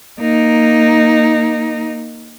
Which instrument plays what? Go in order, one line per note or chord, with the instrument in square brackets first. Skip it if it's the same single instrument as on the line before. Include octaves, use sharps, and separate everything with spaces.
[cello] A#3 D#4